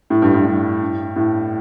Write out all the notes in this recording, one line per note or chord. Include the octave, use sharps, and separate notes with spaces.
A2
G2
G2
G2
A2